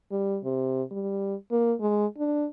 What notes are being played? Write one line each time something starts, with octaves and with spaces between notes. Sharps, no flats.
G3
C3
G3
A#3
G#3
D4